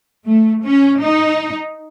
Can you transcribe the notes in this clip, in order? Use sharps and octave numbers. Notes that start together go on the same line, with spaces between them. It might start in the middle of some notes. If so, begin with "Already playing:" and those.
A3
C#4
D#4